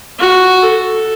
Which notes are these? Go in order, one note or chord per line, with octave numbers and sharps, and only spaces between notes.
F#4
A4